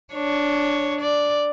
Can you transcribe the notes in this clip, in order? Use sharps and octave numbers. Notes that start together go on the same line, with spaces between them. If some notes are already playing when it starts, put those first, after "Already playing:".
D4 C#5
D5